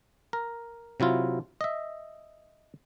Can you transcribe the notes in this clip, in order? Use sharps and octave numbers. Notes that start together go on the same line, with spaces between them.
A#4
C3 F#3 E4 F4
D#5 E5